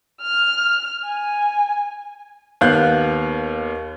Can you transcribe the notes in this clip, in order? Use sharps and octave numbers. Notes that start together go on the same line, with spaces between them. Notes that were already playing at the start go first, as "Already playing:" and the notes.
F6
G#5
D#2 B3 F5 F#6 G6